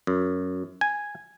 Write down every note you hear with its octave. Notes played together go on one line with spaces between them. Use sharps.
F#2
G#5